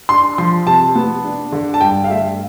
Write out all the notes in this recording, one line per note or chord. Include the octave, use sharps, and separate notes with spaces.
D4 C6
F3 C6
C3 A5
B3
D4
D3
A5
G2 G5
F5
A3 E5